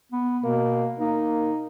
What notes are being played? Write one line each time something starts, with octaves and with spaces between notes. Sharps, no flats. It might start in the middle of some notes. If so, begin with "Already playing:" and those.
B3
B2 A#3
A#3 D#4